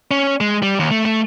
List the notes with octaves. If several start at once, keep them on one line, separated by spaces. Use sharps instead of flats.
C#4
G#3
G3
D#2
A3
A3